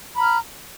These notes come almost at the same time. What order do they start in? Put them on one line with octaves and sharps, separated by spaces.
B5 A#5 F6